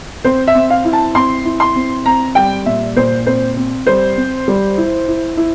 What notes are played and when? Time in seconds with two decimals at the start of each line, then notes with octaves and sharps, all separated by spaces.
0.24 C4 C5
0.47 E5
0.55 C4
0.70 F5
0.85 E4
0.93 A5
1.15 C4 C6
1.45 E4
1.60 C6
1.76 C4
2.05 C4 A#5
2.35 G3 G5
2.66 A#2 E5
2.96 A#2 C5
3.27 C4 C5
3.57 C4
3.87 G3 C5
4.17 C4
4.48 G3
4.78 E4
5.08 E4
5.37 E4